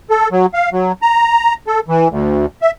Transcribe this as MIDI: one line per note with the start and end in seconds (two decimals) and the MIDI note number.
0.10 0.28 69
0.32 0.46 54
0.54 0.70 77
0.72 0.92 54
1.02 1.54 82
1.67 1.80 69
1.88 2.08 52
2.10 2.46 38
2.62 2.71 76